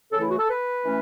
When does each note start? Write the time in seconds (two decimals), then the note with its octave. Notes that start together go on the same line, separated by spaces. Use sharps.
0.12 C#3 E3 A3 A4
0.21 E4
0.30 F#4
0.38 A4
0.48 B4
0.83 E3 A3 C#4